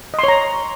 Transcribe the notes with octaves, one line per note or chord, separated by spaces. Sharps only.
C#5 D#5 A#5 C6